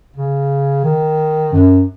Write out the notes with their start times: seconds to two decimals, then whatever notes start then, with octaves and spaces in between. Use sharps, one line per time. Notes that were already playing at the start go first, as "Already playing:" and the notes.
0.16 C#3
0.84 D#3
1.53 F#2